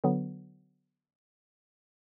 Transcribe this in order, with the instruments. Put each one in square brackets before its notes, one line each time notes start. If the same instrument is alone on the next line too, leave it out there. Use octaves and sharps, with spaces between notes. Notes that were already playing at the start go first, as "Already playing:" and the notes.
[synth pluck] D3 F#3 B3